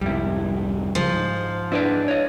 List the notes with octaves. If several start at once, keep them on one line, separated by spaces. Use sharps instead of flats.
C2 F2 G#2 G3 E4
C#3 F3
G#2
D4 E4 B4 D5
C#5 D#5